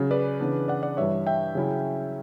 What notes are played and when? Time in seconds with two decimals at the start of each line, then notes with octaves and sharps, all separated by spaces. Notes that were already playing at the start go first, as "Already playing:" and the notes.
Already playing: C#3 F#3 C#4
0.11 B4 D5
0.40 C#3 E3 B3 D4
0.68 D5 F#5
0.83 D5 F#5
0.97 G2 E3 G3 D4 C#5 E5
1.27 E5 G5
1.55 C#3 F#3 C#4 E4